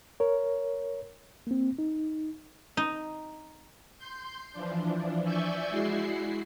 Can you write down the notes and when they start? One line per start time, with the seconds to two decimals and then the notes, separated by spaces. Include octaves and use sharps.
0.20 A#4 C#5
1.47 A#3 C4
1.79 D#4
2.77 D#4
3.98 C6 G6
4.53 E3 F3 D4
5.23 D5 E5 G#5 C#6 E6 G6
5.70 G#3 E4 F#4 C7